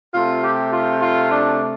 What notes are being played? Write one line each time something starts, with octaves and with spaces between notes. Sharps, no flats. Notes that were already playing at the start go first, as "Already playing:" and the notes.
C3 A3 F4
G4
F4
F4
D4